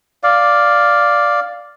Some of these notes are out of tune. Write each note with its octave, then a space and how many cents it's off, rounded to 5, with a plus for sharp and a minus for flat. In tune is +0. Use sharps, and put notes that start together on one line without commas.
D5 +0 F5 +0